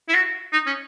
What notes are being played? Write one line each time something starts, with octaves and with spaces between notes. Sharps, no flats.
E4
F#4
D#4
C#4